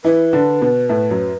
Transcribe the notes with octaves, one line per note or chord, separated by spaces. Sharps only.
E3 E4 B4
D3 D4
B2 B3
A2 A3
F#2 F#3